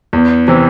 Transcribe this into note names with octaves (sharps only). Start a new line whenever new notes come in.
E2
C3 E3